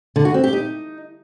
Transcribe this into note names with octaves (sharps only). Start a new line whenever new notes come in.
D3
F#4
C4
G4
D#4